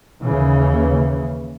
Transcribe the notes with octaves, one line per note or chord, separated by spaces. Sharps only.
D#2 C#3 E3